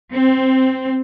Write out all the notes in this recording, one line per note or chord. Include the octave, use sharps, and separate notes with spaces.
C4